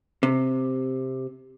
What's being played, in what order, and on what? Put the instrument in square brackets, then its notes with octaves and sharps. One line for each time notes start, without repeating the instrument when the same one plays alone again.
[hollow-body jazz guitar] C3